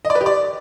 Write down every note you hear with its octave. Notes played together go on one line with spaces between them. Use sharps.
D#5
D5
B4
G4
D5